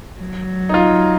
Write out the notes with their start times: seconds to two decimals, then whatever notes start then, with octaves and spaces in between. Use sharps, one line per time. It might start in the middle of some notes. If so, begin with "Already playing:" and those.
0.20 F#3
0.69 D#4
0.74 F4